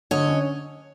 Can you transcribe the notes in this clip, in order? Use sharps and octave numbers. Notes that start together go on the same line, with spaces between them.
D3 C#5 D#5
C#4